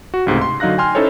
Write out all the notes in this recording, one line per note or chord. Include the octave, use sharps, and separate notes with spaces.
F#4
C#2 G#2 C3 A3
C6
D3 F#3 D#4 F5 F#6 A#6
G5 G#5 C6 F6
C#4 D#4 E4 A4 C5 C#5